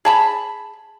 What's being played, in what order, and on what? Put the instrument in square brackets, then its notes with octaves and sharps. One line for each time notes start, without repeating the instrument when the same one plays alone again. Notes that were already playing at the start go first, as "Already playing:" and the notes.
[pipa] G#4 A5 B5